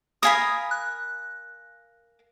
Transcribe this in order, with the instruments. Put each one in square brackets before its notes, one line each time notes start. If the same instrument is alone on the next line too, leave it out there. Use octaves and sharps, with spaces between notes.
[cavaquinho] A#4 F5 G#5 B5 [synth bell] D#6
[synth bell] F#6